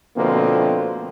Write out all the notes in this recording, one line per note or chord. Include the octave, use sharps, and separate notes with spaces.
B2 D3 F3 A3 A#3 C4